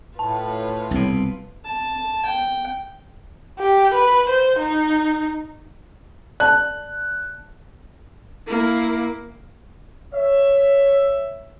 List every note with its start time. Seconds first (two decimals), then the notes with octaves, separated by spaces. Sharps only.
0.19 A2 F4 B4 A5
0.91 C2 B2
1.65 A5
2.25 G5
3.59 G4
3.94 B4
4.29 C5
4.59 D#4
6.40 D5 A5 F#6
8.48 A#3 E4
10.14 C#5 E5